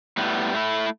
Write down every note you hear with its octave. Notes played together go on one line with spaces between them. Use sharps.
A2 G3 B3
A2 A3 E4